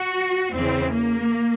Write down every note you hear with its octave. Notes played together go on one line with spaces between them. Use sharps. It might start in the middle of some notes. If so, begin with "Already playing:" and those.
Already playing: F#4
E2 C#3 E3 C4
A#3